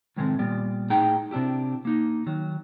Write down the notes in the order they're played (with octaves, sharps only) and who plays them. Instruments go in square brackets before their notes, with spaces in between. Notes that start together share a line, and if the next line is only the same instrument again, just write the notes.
[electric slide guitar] A2 C3 D#3 G#3 A3 C4
A#2 G3 B3 D5
A2 D#4 G#4 G5 A#5
C3 C4 D4 E4 G4
A#3 D#4
D#3 F#3